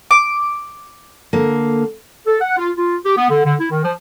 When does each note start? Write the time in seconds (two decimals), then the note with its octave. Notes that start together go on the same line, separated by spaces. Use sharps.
0.11 D6
1.33 D3 A#3
2.27 A4
2.41 F#5
2.58 F4
2.77 F4
3.05 G4
3.17 B3
3.30 D3
3.45 D3
3.60 E4
3.71 D#3
3.85 F3